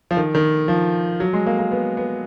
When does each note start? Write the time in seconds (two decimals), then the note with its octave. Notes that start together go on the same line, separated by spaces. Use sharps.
0.11 F3
0.17 D#3
0.35 D#3
0.68 F3
1.20 F#3
1.33 G#3
1.46 A#3
1.59 A#3
1.72 B3
1.97 B3